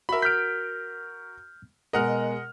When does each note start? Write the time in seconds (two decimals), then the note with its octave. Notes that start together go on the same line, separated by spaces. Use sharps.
0.09 F#4 A#4 E5 B5
0.22 F6 G6 B6 D7
1.93 B2 G#3 A#4 D#5 F#5 F6